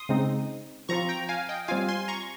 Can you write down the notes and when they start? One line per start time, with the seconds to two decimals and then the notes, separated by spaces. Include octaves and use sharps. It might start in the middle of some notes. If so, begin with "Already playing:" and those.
Already playing: C6 D#6
0.09 C#3 G#3 C4 D#4
0.89 F3 C4 F4 A#5 C#6
1.09 G5 A#5
1.29 F5 G#5
1.49 D#5 G5
1.68 G3 C4 F4 F5 G#5
1.89 G#5 C6
2.08 A#5 C#6